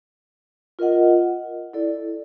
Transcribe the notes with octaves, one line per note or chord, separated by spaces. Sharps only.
F4 A#4 D#5 F#5
E4 A4 D5